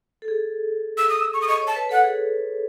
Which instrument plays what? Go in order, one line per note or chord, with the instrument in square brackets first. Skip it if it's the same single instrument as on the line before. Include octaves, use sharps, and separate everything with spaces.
[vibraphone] A4
G#4
[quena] E6
D#6
E6
C#6
D#6
[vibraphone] D#5 [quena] C#6
[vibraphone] C#5
[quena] A5
[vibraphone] B4
[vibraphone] A4 [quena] F#5
[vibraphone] G#4